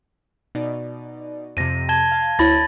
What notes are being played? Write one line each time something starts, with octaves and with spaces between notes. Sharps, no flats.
B2 D#4 D5
F2 C3 A#6 D#7
A5 G#6 G7
F5
D2 E4 C#5 B5 A6 A#6